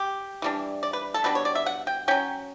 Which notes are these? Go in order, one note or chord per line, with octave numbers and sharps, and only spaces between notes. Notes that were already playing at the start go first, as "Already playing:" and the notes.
Already playing: G4
E3 G3 D4
D5
B4
A4
B2 G3 D4 B4
C#5
D5
E5
F#5
G5
F#3 C#4 G5